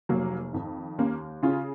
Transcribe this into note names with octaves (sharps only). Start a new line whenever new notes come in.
F1 F#3 A#3
F2 D#3
D#2 A#3 C#4
C#3 C#4 F4